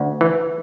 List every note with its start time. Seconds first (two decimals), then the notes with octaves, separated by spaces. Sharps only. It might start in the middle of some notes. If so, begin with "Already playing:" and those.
Already playing: D2
0.21 E3